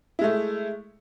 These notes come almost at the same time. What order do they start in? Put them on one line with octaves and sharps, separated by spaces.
E4 G#3 A3